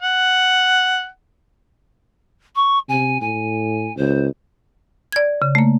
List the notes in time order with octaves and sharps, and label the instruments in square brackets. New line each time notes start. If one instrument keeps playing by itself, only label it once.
[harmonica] F#5
[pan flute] C#6
[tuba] C3 [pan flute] G#5
[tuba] A2 [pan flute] G#5
[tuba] C#2 [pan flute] C5
[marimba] D5 G#6
C#3
A3 A#3